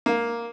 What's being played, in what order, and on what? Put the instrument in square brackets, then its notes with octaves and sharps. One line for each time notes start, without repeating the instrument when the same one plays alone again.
[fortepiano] A#3